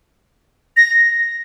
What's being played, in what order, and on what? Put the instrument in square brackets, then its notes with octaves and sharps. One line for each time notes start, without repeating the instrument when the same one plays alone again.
[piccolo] A#6